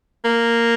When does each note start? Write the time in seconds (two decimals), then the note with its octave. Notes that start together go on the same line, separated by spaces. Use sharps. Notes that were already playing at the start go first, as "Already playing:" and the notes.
0.25 A#3